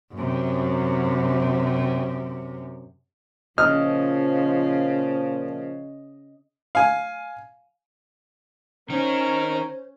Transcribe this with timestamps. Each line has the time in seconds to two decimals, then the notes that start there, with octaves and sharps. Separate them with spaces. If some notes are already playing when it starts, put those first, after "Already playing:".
0.14 F#2 C3
3.58 A#2 C#3 F3 D#5 F6
6.75 F5 G#5
8.90 D#3 C#4 D#4 C5 A#5